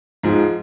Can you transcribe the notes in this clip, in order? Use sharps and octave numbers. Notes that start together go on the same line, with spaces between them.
G#2 F3 G#3